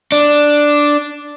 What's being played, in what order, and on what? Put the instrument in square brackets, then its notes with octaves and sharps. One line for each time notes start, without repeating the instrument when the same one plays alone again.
[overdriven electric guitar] D4